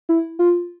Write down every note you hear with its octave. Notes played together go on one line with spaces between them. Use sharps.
E4
F4